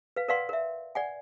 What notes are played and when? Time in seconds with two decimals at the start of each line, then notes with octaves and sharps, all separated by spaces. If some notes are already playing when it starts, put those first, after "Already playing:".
0.17 B4 F5
0.28 A#4 B4 D5 F5 F#5 C6
0.49 A#4 E5
0.95 D5 F#5 G#5